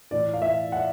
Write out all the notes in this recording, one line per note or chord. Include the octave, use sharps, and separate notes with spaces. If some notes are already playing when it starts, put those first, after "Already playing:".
A2 E3 D5
F5
E5
F#5